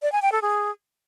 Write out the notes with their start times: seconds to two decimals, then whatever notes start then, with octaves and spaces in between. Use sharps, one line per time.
0.02 D5
0.12 G#5
0.22 G5
0.32 A4
0.42 G#4